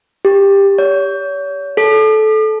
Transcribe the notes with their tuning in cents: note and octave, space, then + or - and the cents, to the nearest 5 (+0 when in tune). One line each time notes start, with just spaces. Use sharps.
G4 +15
C#5 +40
A4 -20